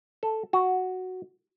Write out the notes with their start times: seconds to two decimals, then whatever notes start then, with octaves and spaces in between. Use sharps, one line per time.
0.23 A4
0.53 F#4